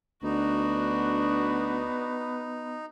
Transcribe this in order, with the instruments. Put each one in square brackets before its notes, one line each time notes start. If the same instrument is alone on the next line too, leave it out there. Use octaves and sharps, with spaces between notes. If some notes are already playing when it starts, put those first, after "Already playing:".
[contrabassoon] D2 [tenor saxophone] B3 [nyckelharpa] D4 F#4 [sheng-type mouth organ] D#4